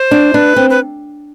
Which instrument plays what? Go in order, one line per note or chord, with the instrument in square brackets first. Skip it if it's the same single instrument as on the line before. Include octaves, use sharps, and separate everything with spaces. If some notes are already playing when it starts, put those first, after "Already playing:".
Already playing: [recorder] C5
[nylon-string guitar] D4
[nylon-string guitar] D4 [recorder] B4
[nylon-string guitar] C4
[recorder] B4